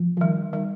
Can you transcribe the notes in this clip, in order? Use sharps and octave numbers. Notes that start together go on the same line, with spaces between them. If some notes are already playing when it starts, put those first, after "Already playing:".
Already playing: F3
F3
D#3 G3
D#3 G3